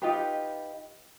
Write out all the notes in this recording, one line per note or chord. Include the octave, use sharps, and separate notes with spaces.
D#4 F4 G4 B4